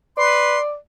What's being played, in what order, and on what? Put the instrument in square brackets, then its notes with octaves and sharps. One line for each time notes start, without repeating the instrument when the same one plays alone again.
[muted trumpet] B4 [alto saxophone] D5 [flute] C6